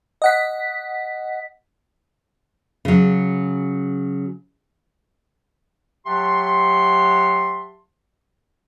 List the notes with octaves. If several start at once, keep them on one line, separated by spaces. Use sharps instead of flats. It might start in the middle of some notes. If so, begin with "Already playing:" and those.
D#5 F#5 B6
C#3 F#3
F#3 G4 E5 F#5 A5 C6